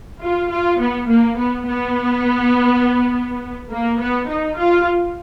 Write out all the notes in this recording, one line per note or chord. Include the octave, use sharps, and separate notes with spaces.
F4
F4
B3
A#3
B3
B3
A#3
B3
D#4
F4